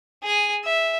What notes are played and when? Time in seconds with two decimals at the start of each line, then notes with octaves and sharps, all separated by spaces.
0.23 G#4 G#5
0.64 E5